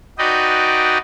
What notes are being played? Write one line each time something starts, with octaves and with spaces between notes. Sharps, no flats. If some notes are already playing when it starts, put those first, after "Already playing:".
D#4 F#4 B4 D5 D#5 G5